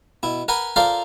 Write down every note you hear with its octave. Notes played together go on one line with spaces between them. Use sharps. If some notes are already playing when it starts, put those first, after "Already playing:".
B2 E4
A#4 B4 F#5 G#5 B5
F4 A4 A#4 C5 D5 F5